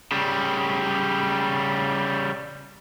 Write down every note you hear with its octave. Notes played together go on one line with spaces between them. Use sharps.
C#3 G3